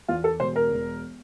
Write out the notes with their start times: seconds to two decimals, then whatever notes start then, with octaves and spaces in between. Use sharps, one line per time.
0.08 E2 F4
0.24 A4
0.40 E1 C5
0.56 A#4
0.71 E1